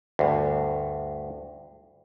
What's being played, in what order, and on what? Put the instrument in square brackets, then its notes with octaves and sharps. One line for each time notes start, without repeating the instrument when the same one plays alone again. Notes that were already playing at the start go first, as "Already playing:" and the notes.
[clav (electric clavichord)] D2 G2